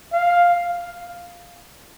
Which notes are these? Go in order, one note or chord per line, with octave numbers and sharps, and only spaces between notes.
F5